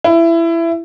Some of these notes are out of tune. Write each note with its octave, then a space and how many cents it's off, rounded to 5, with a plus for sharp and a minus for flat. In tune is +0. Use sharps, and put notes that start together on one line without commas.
E4 +20